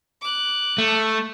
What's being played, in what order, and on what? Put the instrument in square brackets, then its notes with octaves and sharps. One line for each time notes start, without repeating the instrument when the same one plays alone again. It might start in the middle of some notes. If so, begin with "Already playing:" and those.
[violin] D6 F#6
[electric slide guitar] A3